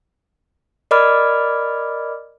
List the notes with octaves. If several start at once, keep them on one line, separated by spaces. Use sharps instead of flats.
A#4 D5 D#5 B5 D6 F6